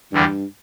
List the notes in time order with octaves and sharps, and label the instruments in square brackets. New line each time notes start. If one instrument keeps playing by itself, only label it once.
[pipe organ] E2 D3 G3 [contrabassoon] G2